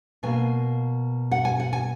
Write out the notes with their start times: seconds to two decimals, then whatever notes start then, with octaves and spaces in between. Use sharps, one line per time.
0.23 B2 A#3 G#5
1.32 F#5
1.45 G#5
1.60 F#5
1.73 G#5